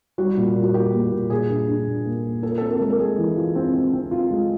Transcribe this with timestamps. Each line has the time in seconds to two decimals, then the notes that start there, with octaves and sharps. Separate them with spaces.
0.18 G3 F#4
0.37 A#2
0.56 A#3
0.63 F#4
0.74 A#3 G4
0.93 A#3
1.12 A#2
1.30 A#2 G#4
1.49 D4
1.68 D4
1.87 A#2
2.05 A#3
2.24 A#3
2.43 F4 A4
2.51 A#4
2.58 A4
2.62 C4 A#4
2.73 A4
2.80 G#3 A#4
2.89 A4
2.99 G#3 G#4
3.18 E3
3.36 F4
3.56 C4
3.74 C4
3.93 C4
4.11 F4
4.31 G#3